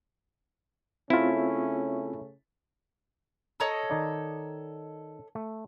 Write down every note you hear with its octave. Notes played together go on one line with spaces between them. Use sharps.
C#3 A3 C4 C#4 E4 F4
A4 C#5 D#5 A#5
D#3 D#4 D5
A3